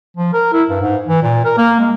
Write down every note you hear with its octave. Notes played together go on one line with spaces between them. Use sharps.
F3
A#4
E4
G2
G#2
E3
A#2
A#4
A#3
G#3